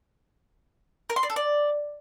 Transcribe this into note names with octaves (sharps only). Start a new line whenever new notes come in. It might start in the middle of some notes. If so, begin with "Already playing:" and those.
A#4
C6
D5
A4
D5